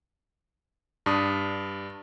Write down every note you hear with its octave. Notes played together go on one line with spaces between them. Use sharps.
G2 D4 D#6